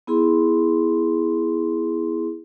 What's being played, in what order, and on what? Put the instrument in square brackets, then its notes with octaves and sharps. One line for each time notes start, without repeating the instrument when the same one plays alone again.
[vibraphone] B3 E4 G#4 C6